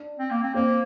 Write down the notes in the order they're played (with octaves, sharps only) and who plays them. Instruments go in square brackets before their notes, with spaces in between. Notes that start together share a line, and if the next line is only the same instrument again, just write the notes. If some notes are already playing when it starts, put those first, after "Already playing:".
Already playing: [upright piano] D4
[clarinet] C4
A#3
C4
[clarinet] A#3 [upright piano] C4